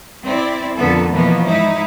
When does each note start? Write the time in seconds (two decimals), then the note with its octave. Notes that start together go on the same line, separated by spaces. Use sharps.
0.24 C4 E4 D5
0.76 F2 A#2 D3 B3 A4
1.12 B2 E3 F3 A#3 B3
1.46 G#2 D#4 E4